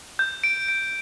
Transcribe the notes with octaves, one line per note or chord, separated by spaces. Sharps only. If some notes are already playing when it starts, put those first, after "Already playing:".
G6
D7
D7